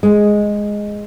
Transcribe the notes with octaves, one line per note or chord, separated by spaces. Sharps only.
G#3